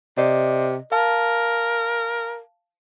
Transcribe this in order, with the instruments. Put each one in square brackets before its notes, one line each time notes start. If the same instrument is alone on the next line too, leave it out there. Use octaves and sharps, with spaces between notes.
[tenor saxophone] C3 [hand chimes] D5 D#5
[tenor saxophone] A#4 [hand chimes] F5 A5